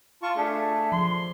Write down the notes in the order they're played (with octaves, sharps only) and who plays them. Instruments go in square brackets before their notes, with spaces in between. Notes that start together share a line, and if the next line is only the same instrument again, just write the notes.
[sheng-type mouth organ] F4 C#6 [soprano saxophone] A5
[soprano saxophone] A3 [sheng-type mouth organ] D4 G#4
[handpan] F3 [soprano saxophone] C6